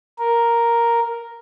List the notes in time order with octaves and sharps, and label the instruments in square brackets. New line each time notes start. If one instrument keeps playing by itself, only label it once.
[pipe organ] A#4